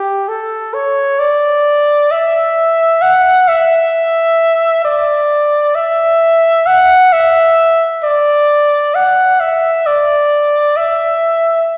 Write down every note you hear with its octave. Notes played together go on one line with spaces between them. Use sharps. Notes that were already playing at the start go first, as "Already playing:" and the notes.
Already playing: G4
A4
C#5
D5
E5
F#5
E5
D5
E5
F#5
E5
D5
F#5
E5
D5
E5